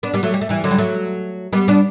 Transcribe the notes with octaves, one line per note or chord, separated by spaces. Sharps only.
B3 D4
G3 B3
F#3 A3
G3
A3
E3 G3
D3 F#3
G3
F#3 A3
G3 B3
B3 D4